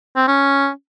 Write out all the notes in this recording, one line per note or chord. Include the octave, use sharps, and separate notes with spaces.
C4
C#4